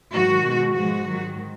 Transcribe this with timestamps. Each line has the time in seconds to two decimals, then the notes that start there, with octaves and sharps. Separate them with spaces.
0.12 G#2 D#3 F#3 F#4
0.44 B2 G#3
0.74 G#2 F3 G#3 F#4
1.07 G#2 D#3 F#3